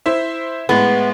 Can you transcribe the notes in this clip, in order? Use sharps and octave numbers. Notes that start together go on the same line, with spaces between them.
E4 C5 E5
A2 G#3 B3